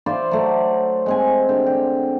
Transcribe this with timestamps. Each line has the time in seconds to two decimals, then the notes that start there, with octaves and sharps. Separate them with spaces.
0.06 F4 C5 D5 E5
0.31 F#3 A3
1.06 G#3 C4 G#5
1.49 D3 G4
1.66 G4